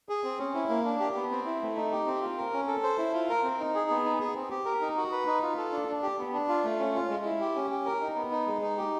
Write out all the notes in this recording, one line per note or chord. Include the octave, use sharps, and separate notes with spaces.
G#4
C4
C#4
E4
A#3
D4
G4
B3
C4
E4
A3
D#4
G4
C4
F4
A#4
C#4
A4
C5
E4
F4
A#4
C4
D#4
G#4
B3
D#4
G#4
C4
G4
A#4
D#4
F#4
B4
D#4
F4
A4
D4
D4
G4
B3
D4
F4
A3
C#4
F4
G#3
E4
G4
C#4
G4
A#4
D#4
B3
D#4
G#3
D#4
G4